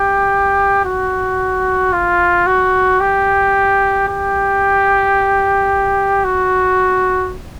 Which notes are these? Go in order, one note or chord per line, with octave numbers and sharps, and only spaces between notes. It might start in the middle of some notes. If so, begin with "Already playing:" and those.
Already playing: G4
F#4
F4
F#4
G4
G4
F#4